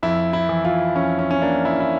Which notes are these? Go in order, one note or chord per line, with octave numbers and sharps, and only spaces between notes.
F2 E4
E4
E3
F4
F2 C#4
C#4
C#4
A#3 D4
E4
E4